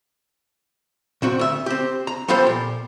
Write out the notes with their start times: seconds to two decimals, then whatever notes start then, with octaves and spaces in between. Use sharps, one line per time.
1.22 A#2 C4 F#4
1.39 D2 E5
1.66 C4 G4
2.07 A#5
2.28 F3 B3 F4 G4 A4 C5
2.47 A#2